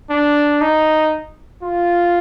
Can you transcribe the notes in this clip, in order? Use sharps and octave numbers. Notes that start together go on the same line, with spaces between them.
D4
D#4
F4